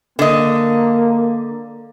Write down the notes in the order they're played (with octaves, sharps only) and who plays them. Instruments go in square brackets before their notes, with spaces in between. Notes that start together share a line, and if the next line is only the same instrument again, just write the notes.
[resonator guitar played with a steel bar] D3 D#5 [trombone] A#3